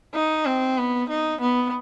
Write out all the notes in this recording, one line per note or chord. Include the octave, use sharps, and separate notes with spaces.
D#4
C4
B3
D#4
B3